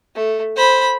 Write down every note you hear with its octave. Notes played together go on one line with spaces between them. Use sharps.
A3
C5 B5